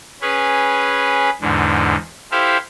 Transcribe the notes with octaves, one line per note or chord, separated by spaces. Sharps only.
C#4 G#4 B4
E2 G#2 D3
E4 G4 A4 C5 E5 F5